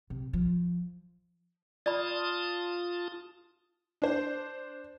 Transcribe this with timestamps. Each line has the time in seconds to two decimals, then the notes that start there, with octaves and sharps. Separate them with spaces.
0.10 C3
0.33 F3
1.86 F4 D5 A5 B5 D#6
4.02 D4 C5